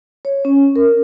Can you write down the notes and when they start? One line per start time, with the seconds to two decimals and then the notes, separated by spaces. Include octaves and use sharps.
0.25 C#5
0.45 C#4
0.76 A#4